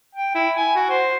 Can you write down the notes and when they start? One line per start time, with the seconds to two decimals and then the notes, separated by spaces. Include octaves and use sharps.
0.15 G5
0.35 E4
0.56 G#5
0.76 F#4
0.89 C5